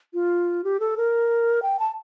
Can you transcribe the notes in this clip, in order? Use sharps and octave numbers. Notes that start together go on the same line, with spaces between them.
F4
G4
A4
A#4
G5
A5